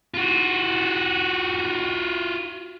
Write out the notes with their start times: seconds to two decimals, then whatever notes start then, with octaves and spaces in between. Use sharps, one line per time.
0.14 F4 F#4